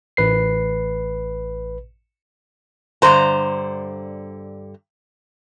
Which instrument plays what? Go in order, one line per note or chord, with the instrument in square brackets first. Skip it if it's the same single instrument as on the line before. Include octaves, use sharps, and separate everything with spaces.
[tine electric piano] A1 B4 C7
[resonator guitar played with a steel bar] G2 D3 C5 A#5